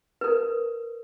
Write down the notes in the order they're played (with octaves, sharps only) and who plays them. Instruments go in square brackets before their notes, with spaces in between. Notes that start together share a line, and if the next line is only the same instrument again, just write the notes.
[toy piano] A#4 B4